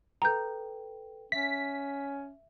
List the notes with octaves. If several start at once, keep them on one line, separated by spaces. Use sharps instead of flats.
A4 B4 G5 A#5 G6
C#4 E5 B6